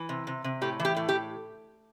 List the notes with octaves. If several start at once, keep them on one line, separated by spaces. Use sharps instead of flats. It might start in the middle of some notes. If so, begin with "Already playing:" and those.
Already playing: E3
C3
C3
C3
A2 G4
E3
G4
A2
G4